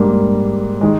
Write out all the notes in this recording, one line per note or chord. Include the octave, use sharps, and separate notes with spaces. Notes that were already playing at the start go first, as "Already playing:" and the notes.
Already playing: G#2 G3 A#3 D4
D#3 G#3